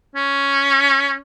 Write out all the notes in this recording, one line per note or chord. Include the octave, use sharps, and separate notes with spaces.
C#4